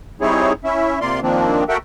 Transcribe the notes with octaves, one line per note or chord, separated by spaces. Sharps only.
G3 C4 D#4 E4 G#4 C#5
C#4 E4 E5
C3 A#3 F4 D5 C6
D#3 F3 A#3 C4 D4
F#4 A4 A#4 E5 F#5 G5